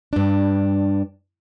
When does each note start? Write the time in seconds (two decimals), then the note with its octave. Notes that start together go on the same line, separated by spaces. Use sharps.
0.13 G2 D4